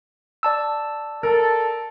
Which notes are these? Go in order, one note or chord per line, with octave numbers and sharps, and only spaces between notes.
D5 A5 E6
A4 A#4